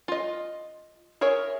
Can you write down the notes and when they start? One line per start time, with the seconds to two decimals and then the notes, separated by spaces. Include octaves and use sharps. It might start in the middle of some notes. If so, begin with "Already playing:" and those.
0.08 F4 D#5
1.21 G#4 A#4 C#5 E5